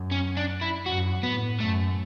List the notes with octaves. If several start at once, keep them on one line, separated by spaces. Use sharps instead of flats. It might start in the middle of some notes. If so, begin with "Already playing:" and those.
Already playing: F#2
C#4
D4
E4
F#2 F#4
A2 B3
F#2 A3